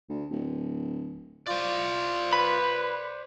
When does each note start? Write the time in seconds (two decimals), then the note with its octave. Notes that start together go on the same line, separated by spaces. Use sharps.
0.09 D2
0.30 D1
1.47 F4 C5 D5
2.33 B4 B5